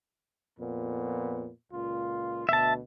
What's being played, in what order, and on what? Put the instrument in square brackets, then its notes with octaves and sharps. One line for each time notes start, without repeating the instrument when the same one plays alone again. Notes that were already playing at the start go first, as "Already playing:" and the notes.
[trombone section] F2 A#2 B3
C#2 A#2 F4
[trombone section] D2 B2 [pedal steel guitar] E5 A5